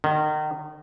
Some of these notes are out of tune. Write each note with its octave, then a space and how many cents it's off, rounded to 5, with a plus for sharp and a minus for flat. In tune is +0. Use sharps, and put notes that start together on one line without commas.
D#3 -30